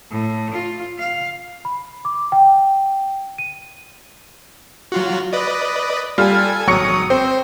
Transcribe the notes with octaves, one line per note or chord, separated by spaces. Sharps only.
A2
F4
F5
B5
D6
G5
D#7
F#3 F4 F#4
B4 D5 D#5
G3 F4 A4 G#5
G#1 F#3 C#6 D#6 C#7
C4 C5